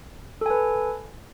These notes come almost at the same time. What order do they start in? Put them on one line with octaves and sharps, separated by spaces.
A4 G#5 B4